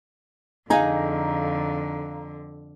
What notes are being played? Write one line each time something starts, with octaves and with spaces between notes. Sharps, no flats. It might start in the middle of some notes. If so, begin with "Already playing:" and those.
F2 D3 D#4 G#4 F5 A#5